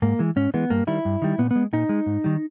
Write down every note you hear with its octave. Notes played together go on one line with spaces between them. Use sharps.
G#2 A#3
E3 G#3
G#2 C#4
E3 G#3 B3
G2 A#3
D#3 G3 E4
G2
D#3 G3
A#2 B3
G#3 B3
A#2 D#4
G#3
G#2
D#3 G3